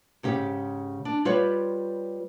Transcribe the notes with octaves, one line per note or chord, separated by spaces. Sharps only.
G#2 C#3 G4
D4
G3 F4 G4 B4 C#5